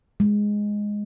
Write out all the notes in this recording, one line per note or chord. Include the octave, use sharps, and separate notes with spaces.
G#3